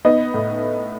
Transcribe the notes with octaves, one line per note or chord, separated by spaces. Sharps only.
B3 D#4 D#5
A2